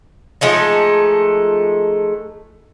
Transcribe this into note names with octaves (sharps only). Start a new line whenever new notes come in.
F3 G#3 A3 D#4